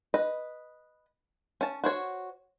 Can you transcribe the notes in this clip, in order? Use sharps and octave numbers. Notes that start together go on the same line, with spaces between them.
B4 D#5
C#4 A5
F#4 C5 C#5